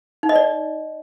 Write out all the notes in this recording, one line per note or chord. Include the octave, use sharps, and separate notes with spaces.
D#4
D#5
D5